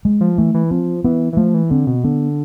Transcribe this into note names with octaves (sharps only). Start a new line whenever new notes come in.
G#3
F3
E3 A3
E3
F3 C4
E3 B3
E3
F3 A3
E3
D3 C4
B2
D3 B3